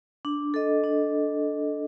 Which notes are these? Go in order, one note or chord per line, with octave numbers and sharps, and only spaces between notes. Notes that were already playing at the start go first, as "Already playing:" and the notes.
D4
A4 D#5
D4